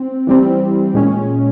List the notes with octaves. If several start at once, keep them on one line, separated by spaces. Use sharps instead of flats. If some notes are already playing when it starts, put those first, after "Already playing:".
Already playing: C4
E3 G3 C4
A#2 G#3 C#4